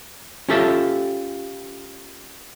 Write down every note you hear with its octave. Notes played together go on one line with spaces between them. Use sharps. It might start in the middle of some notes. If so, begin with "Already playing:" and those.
C#4 F4 G4 A4 E5 A5